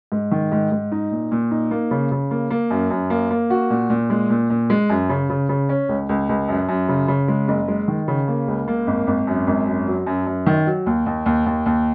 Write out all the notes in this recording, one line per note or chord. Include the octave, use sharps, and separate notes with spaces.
G#2
D#3
G#2
G#2
D#4
A#2
A#2
D#4
A#3
C#3
C#3
A#3
A#3
F#2
F#2
A#3
A#3
F#4
A#2
A#2
G#3
A#2
A#2
G#3
F#2
C#3
C#3
C#3
C#4
C#2
C#2
C#2
F#2
F#2
C#3
C#3
G#3
F#1
G#3
D#3
C#3
A#3
C#2
A#3
G#1
G#1
F#2
G#1
F#2
F#3
F#2
F#2
D#3
F#3
D#2
D#2
D#2
D#2
D#2